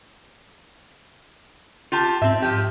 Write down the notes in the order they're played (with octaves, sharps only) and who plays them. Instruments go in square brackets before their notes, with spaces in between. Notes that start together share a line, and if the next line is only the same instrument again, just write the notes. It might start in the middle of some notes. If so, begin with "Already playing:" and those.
[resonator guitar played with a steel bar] F4 G4 A5
[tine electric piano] G#2 A5 [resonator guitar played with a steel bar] C4 E5
[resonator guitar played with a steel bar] F3 G4